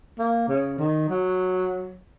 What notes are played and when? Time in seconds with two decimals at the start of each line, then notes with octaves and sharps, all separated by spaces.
0.19 A#3
0.48 C#3
0.78 D#3
1.09 F#3